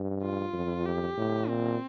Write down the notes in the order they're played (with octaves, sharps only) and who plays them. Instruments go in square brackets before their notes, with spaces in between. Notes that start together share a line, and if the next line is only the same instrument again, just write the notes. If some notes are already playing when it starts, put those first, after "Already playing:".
Already playing: [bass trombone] G2
[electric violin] F4
[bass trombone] F2
[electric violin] G4
[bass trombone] A2
[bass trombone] A#2 [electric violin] C4